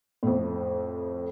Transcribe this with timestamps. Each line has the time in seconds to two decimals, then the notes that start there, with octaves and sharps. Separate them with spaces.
0.23 F2 A2